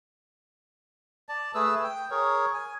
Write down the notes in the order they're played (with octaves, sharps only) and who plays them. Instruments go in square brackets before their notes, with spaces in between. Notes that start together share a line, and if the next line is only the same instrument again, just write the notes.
[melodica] D5 A5
A3 G#4 B4 E6
G5
G#4 A#4 C#5
G#5